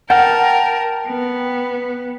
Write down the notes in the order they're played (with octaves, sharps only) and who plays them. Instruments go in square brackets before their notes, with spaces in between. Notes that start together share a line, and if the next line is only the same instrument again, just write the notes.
[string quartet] A#4 [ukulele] F#5 [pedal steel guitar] G5 A5 F6
[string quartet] B3